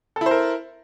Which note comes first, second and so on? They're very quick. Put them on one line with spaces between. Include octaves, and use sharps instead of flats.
A4 E4 C5 A#4